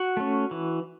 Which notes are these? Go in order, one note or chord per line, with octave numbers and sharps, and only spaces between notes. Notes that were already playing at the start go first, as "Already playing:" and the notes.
Already playing: F#4 F#5
A3 C#4
E3